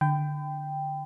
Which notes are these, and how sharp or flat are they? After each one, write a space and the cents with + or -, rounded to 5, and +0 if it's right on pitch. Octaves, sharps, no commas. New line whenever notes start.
D3 +15 G5 +0 B5 +40